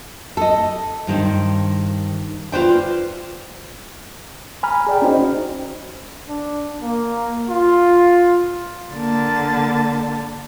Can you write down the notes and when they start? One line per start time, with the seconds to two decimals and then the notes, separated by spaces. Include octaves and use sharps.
0.37 A4 D#5
1.07 G2 D#3 C5
2.52 F4 G4 B4 C5 D5 G5
4.63 G#5 A#5 B5 F6
4.87 G#4 D5 G5
5.02 C#4 D#4 F#4 C5 D#5
6.28 D4
6.81 A#3
7.49 F4
8.93 D3 A#3 A5 A6